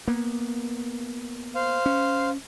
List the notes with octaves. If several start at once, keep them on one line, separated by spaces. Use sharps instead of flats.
A#3 B3
C5 F5
C#4